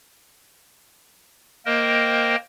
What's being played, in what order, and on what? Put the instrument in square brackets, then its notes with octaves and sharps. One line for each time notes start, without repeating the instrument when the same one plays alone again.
[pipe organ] A#3 A#4 C5 D#5 G5